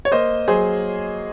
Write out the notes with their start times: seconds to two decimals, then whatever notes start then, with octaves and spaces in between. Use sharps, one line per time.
0.05 C#5
0.12 A#3 C5 D#5
0.48 F#3 G#4 C5